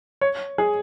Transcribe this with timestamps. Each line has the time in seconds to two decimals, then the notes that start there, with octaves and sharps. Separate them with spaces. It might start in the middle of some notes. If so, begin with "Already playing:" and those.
0.21 C#5
0.58 G#4